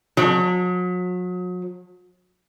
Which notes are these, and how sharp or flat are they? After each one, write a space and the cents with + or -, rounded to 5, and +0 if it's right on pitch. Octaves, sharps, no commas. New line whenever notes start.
F#3 -40